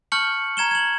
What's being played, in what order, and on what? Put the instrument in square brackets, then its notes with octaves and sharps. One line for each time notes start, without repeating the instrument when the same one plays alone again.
[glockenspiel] A5 C#6 F6 G6 C#7 F#7
A#5 G#6 E7 G7
G#6 F#7